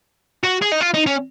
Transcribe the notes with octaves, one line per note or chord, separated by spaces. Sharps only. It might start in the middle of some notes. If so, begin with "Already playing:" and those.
F#4
G#4
D#4
F4
D#4
C#4